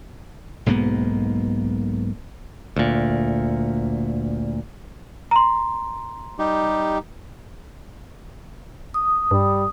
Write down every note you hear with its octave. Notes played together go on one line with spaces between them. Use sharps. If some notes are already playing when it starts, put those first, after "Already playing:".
B1 G#2 A#3 B3
D2 A#2
A#5 C6
G3 D#4 G4
D#6
G2 G3